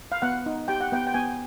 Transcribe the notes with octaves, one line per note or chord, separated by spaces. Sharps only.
F5
B3 F#5
D#4
G4 G5
F#5
B3 G5
G5
B3 G#5